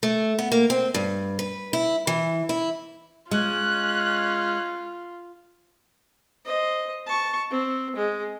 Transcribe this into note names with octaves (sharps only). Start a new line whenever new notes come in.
A3
B3
A#3
C4
G2
B4
E4
E3
E4
G#3 C#4 F4 F#6
C5 D#5
A5 C#6
C4
G#3